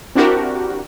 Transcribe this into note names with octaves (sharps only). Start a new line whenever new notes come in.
C4 D4 E4 F#4 G4 A#4